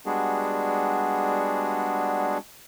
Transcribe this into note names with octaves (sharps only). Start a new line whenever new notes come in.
G3 G#3 B3 D4 F#4 G#4